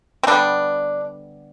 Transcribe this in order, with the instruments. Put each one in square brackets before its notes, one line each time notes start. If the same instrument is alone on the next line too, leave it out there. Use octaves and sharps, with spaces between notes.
[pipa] C4
D3 G3 B3 D4